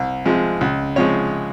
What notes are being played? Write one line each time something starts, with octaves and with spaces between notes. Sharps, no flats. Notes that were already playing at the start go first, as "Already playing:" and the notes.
Already playing: C2
C3 F3 G#3
C#2
C3 F3 G#3 C#5